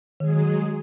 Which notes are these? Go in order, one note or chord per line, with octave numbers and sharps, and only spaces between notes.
D#3 F#3 G#3 G#4